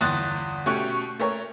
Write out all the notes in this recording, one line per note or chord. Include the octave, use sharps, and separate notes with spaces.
G1 E2 C6 D#6 F#6 A6
B2 A3 C#4 G4 C#6 F#6
A3 A#4 C#5